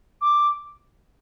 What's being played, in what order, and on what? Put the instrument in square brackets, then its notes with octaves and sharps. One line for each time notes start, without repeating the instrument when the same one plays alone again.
[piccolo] D6